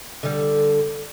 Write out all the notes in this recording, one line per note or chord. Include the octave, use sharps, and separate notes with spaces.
D3 G3